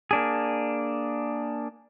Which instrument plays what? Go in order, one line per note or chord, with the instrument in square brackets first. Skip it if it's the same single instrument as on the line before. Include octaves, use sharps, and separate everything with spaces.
[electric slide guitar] A#3 D4 G#4